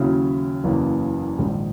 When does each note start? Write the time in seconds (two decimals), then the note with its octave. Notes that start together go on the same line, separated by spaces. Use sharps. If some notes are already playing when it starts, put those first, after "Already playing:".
Already playing: D#2 C#3 F#3 C#4 E4
0.64 F#1 E2 C#3 E3 A#3
1.39 A#1 G#2 D#3 G#3